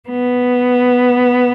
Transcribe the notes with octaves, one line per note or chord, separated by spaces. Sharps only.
B3